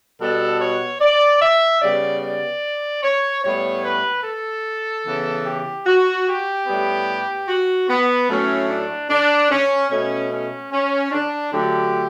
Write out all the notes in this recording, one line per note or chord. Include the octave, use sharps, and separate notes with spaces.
B2 G3 B3 A4
C#5
D5
E5
C#3 G3 B3 D5
D5
C#5
A2 G3 B3 C#5
B4
A4
C#3 E3 B3
G4
F#4
G4
A2 G3 B3
F#4
B3
A2 F#3 A3 C#4
D4
D4
C#4
B2 A3 C#4
C#4
C#4
D4
D3 F#3 A3 G4